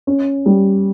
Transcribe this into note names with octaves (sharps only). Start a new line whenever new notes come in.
C#4
G3